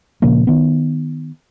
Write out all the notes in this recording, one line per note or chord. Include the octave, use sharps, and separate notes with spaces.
A#2 C#3 F3 A#3
D#3 B3